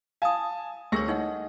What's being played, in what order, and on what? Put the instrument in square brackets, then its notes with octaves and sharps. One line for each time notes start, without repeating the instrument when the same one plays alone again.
[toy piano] F5 D#6 [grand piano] G#5 A5
[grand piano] D2 C#6 A#6 [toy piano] G#4 A#4 C#5
[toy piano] D#4 C#5 F#5 [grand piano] D#5